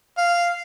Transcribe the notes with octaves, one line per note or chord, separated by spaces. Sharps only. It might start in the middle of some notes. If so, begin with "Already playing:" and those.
F5